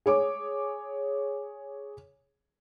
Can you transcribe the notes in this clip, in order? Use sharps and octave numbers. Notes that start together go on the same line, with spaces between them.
G#4 C#5 D6